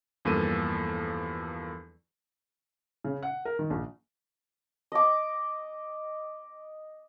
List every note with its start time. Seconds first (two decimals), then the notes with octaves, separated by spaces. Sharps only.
0.25 E2 G2 F3 A#3 A4 D#7
3.04 C#3
3.23 F#5
3.45 A#4
3.59 D#3
3.70 A#1
4.92 D#5 D6